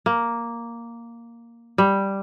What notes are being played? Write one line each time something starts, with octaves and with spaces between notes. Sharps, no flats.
A#3
G3